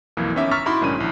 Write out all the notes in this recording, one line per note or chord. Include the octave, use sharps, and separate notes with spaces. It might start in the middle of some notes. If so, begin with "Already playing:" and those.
B1 F2 E3 A#3
D#3 B3 C#4 D#4 E5 D6
A#5 C#6 E6 F6 A6 B6
D#4 E4 F#4 B5 C6 D6
B1 G#2 D#3 C#4 D4 D#7
A#1 E4